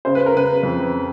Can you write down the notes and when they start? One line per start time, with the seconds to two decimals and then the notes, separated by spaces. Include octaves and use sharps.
0.05 C#3 C5
0.15 B4
0.26 A#4
0.34 C#3 B4
0.63 F2